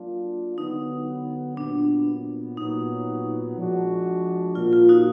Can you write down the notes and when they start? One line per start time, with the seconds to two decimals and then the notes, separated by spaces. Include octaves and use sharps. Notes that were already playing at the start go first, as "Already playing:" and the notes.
Already playing: F#3 A#3 D4 F4
0.58 D3 F#3 B3 D#4
1.57 A#2 F#3 B3 D4
2.57 A#2 F#3 B3 D#4
3.57 F3 G#3 D4 F#4
4.55 A#2 F3 A#3 F4
4.73 F4
4.89 D#4 F#4